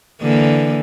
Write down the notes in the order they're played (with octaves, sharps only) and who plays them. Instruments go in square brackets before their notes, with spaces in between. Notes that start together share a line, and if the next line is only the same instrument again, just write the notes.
[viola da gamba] D3 E3 A#3